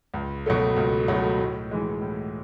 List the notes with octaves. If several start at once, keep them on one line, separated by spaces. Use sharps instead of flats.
C#2
B2 F#3 A3
C#2
B2 F#3 A3
A2
E3 G#3
A2